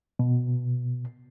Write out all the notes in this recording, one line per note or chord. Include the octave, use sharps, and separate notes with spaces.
B2